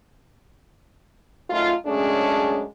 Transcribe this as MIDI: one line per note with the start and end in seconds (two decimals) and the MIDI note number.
1.50 1.73 42
1.50 1.73 57
1.50 1.73 63
1.50 1.73 65
1.86 2.63 42
1.86 2.63 56
1.86 2.63 57
1.86 2.63 61
1.86 2.63 62
1.86 2.63 68